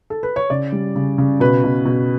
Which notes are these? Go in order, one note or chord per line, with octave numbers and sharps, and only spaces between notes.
A4
B4
C#5
C#3 D5
G3
C#3
C#3
B2 B4
B2
B2